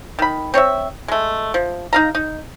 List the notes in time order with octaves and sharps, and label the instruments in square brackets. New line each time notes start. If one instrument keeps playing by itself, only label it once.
[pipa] D#3 B5
C4 C#5 D5 E5
G#3 A3
F3
D#4 F5 A#5
D#4